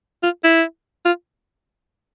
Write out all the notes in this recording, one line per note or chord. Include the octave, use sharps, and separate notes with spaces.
F4
E4
F4